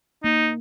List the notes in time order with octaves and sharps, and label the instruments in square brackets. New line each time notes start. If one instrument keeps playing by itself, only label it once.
[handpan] A#3 [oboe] D#4